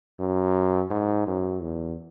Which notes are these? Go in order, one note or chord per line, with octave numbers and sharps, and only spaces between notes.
F#2
G#2
F#2
E2